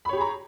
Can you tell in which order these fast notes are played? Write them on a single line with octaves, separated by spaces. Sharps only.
B5 C#5 G4 G#4 A#5